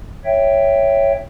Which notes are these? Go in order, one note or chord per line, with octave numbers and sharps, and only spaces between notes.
C#5 E5 G5